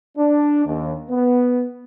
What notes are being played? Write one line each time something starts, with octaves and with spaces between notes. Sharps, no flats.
D4
D#2
B3